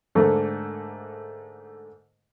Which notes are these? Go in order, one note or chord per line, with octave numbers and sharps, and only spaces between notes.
G#2 D3 A3 A#3